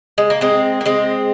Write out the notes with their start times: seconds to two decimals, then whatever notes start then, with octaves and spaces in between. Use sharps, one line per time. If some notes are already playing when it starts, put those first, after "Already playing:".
0.18 G#3
0.30 A#3
0.41 G#3 C4
0.81 A#3
0.85 G#3 C4